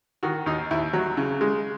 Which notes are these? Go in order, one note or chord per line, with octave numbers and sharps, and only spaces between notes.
D#3 F#4
D#2 D#4
D#2 E4
F#3
C#3
G#3